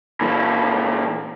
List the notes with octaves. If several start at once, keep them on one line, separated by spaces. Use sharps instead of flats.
A#2 E3